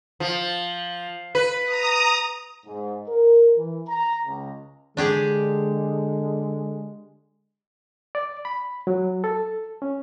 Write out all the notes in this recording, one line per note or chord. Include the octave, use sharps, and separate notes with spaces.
F3
B4
A#5 D#6
G#2
A#4
E3
A#5
C#2
D3 G#3 D4 G4 G#4
D5
B5
F#3
A4
C#4